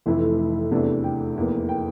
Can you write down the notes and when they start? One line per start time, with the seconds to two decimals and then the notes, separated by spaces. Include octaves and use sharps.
0.06 F1 F2 E3 A3 E4 E5
0.71 E2 C3 E3 A3 D4
1.04 G5
1.36 F1 E2 E3 A#3
1.69 G5